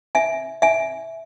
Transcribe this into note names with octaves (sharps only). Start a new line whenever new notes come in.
E5 G#5
E5 G#5